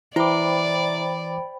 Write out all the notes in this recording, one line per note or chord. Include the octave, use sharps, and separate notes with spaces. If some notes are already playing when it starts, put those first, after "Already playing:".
E3 E4 C5 D5 G5 B5 D6